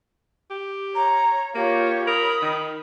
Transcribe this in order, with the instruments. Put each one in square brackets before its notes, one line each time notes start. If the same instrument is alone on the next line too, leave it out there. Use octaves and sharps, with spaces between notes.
[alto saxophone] G4
[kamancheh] C#5 [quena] A#5
[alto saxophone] A#3 [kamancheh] F4 C#5 [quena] G4
[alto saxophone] A#4 [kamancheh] B5 [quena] D#6
[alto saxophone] D#3